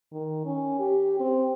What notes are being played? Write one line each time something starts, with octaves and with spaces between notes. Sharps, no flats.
D#3
C#4
G4
C4